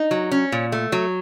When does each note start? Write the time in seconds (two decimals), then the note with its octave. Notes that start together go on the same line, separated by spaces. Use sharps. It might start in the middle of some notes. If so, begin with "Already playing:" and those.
Already playing: D#4
0.11 F#3
0.31 C#4
0.52 A#2
0.72 A3
0.92 F#3